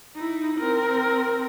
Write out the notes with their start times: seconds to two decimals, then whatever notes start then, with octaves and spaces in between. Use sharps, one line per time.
0.15 D#4 E4
0.58 C4 A#4